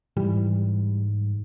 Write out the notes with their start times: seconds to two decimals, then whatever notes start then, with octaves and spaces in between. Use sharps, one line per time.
0.17 G#2 E3 G3